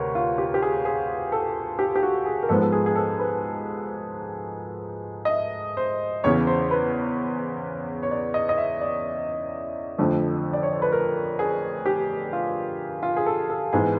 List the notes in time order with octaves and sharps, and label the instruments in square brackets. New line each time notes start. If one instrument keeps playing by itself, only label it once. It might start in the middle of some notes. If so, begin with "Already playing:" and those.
Already playing: [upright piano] D2 C3 A#4 B4 C#5
F4
G4
G4
G#4
G#4
A4
G4
G4
F#4
G#4
A#4
G#2 F3 G#3 B3 A4
A4
G#4
G#4
A4
B4
D#5
E5
C5
E2 C#3 E3 C#5
C5
B4
C#5
D5
D#5
D#5
E5
D5
F2 D3 F3 A3
D5
C#5
C5
B4
A#4
G#4
G4
F4
F4
G#4
A4
A4
G#2 E3 G#3 B3 G#4